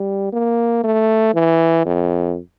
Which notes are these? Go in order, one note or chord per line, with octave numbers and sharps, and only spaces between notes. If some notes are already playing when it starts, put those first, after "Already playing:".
Already playing: G3
A#3
A3
E3
F2